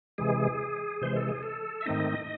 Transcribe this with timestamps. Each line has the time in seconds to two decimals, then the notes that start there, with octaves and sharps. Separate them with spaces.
0.18 C3 E3 G#3 G#4
1.02 C3 E3 G#3 C5
1.16 A4
1.28 G#4
1.43 A4
1.81 E5
1.86 G#2 D#3 A3 C4 D#4 D#5